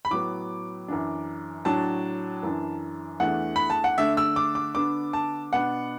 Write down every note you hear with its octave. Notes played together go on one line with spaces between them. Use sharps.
B5
A2 F#3 B3 D6
F#2 E3 D4
A2 F#3 D4 A5
F#2 E3 D4
E2 E3 A3 D4 F#5
B5
A5
F#5
D3 A3 D4 E5
E6
D6
D6
D3 B3 D4 D6
A5
B2 B3 D4 F#5